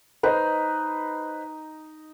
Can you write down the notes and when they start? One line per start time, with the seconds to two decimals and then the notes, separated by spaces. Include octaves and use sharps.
0.23 D#4 B4 C5 D#5